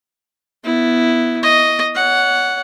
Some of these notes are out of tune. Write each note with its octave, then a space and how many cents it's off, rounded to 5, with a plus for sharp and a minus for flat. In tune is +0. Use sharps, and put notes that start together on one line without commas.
B3 +0 E4 +0
D#5 +0 C#6 +30
C#5 +30 F#5 +0